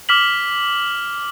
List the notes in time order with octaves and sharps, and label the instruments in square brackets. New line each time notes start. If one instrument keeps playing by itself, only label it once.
[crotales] D6 F6 B6 F#7